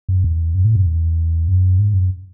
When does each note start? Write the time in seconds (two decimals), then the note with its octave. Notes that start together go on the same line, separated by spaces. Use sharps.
0.09 F#2
0.24 E2
0.55 F#2
0.65 A2
0.75 F#2
0.86 E2
1.48 F#2
1.79 G#2
1.94 F#2